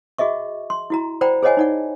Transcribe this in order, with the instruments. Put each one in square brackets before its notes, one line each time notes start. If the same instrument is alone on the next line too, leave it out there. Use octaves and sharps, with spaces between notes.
[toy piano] F#4 G#4 D#5 E5 C#6
C6
E4 F#4 A#5
C5 D5 F#5 G5 A#5 B5
G#4 C5 C#5 D#5 F#5 G#5
D#4 D5 F#5